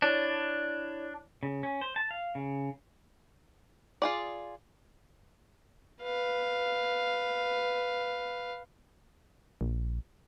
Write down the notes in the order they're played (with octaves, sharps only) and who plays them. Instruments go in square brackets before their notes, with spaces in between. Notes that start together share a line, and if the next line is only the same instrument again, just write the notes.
[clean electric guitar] D4 [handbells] E4 C#5 D5
[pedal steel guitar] C#3
C#4
C5
A5
F5
C#3
[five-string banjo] F4 G#4 D5
[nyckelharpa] B4 F5
[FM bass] A#1